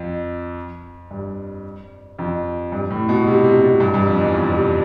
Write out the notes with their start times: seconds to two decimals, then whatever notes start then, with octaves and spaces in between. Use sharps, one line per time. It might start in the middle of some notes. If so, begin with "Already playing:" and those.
Already playing: F2
1.11 G2
2.19 F2
2.72 G2
2.90 A2
3.09 B2
3.27 C3
3.44 C3
3.62 B2
3.80 G2
3.94 G2
4.07 F2
4.21 E2
4.34 F2
4.52 C3